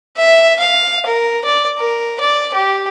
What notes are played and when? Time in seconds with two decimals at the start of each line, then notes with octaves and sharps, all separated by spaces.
0.17 E5
0.60 F5
1.06 A#4
1.45 D5
1.78 A#4
2.20 D5
2.54 G4